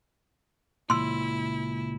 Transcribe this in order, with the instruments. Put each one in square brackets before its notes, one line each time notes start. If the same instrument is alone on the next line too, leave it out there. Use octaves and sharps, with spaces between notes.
[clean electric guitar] C#2 A#2 [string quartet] E4 [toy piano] C6 E6